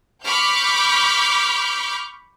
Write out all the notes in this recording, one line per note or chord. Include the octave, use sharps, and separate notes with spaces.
B5 C#6 D6 F6 G6